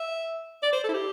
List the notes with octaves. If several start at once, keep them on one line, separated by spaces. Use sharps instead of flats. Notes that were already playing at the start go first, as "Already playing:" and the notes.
Already playing: E5
D5
C5
A4
E4
G4